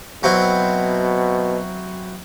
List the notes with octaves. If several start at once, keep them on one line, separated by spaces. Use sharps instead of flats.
B2 F#3 C4 E4